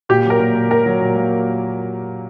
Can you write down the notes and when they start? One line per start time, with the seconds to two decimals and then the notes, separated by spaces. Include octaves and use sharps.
0.09 A#2 G4
0.25 F#3
0.30 A#4
0.40 A#2
0.55 A#2
0.70 F#3 A#4
0.86 F#3
1.01 A#2
1.16 A#3